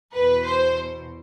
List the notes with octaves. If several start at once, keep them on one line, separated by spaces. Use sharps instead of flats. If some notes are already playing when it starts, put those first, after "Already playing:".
E2 B2 B4
C5